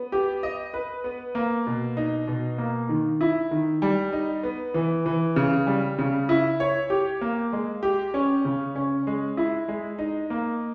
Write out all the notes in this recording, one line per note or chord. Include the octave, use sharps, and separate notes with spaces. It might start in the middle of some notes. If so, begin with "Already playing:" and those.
Already playing: B3
G4
D#5
B4
B3
A#3
B2
D#4
B2
A#3
D#3
E4
D#3
G3
D#4
B3
E3
E3
C#3
G3
C#3
E4
C#5
G4
A#3
G#3
G4
C#4
C#3
C#4
G#3
E4
G#3
D#4
A#3